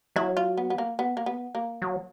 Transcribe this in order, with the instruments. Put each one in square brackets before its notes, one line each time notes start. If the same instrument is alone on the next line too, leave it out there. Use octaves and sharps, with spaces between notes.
[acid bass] F#3 [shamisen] E4
[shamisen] F4
B3
B3
A#3
B3
A#3
B3
A#3
[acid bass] F#3